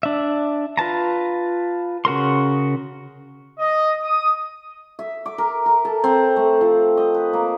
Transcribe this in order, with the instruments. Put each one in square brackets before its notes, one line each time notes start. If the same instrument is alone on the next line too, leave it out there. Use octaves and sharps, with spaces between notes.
[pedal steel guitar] D4 E5
F4 B4 A5 A#5
C#3 F#4 A#4 C6
[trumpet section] D#5
D#6
[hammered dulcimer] E5
D6
A#4
A#4
A4
C4
A3
F3
D#5
B4
A#3